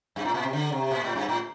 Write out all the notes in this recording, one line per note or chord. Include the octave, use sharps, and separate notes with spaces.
G2
A2
A#2
C3
D3
C3
A#2
A2
G2
A2